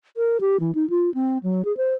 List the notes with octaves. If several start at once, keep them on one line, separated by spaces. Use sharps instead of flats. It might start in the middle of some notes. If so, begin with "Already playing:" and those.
A#4
G4
E3
D#4
F4
C4
F#3
G#4
C5